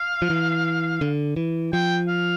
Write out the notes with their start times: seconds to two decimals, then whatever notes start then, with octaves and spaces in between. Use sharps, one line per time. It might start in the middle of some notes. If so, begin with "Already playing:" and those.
Already playing: F5
0.22 F3
0.30 E3
1.01 D3
1.36 E3
1.73 F3 G5
2.09 F5